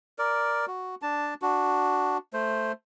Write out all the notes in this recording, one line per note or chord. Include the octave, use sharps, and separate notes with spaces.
A#4 D5
F#4
D4 A5
D4 F#4
A3 C5